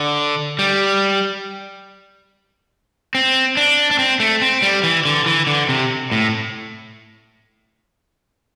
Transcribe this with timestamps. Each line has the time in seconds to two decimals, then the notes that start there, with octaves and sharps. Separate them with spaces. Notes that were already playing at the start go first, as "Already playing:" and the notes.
Already playing: D3
0.59 G3
3.15 C4
3.57 D4
3.91 D4
3.99 C4
4.20 A3
4.42 C4
4.62 G3
4.83 E3
5.05 D3
5.26 E3
5.47 D3
5.69 C3
6.12 A2